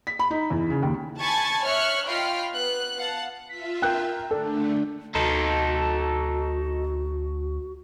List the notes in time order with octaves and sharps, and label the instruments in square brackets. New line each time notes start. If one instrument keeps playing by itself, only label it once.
[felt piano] B6
B5
D#4
E2
C#3
D#2
[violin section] G#5 A5 B5 C#6 G#6 A6
C#5 E5 C#6 F6 F#6
F4 D#5 G5 B5 C6 F6
B3 F#6
F5 F#5 A5
[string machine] F4 E5 [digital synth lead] B6
[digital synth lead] A#4 [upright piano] G5 F#6 G6
[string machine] D3 A3 [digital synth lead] D4 [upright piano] A4
[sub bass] D2 [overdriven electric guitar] D#4 A4 [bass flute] F#4